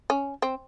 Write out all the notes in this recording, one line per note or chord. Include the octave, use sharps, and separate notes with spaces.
C#4
C4